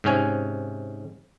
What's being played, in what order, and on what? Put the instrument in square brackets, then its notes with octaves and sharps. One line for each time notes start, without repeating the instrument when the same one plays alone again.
[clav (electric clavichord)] G#2 C3 C#4 G#5